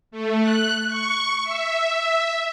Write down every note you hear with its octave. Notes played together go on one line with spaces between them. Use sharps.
A3
F#6
C#6
E5